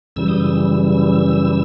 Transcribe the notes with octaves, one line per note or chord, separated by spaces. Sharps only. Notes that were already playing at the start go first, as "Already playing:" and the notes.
F#2 C#3 E3 G3 E6
D#6
E6